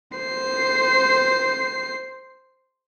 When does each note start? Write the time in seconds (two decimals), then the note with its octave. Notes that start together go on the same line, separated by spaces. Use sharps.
0.18 C5 C7